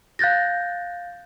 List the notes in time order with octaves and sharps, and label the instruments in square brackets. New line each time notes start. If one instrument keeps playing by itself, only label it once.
[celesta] F5 F#6 G6 A6 A#6